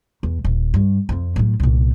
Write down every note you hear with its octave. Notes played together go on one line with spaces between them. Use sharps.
E2
D#1
G2
F2 C4
A2 F#3
C2 A#2